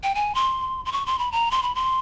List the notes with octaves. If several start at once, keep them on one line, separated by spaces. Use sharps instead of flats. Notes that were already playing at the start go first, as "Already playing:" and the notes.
G5
G#5
C6
C6
C#6
C6
B5
A#5
C6
B5
C6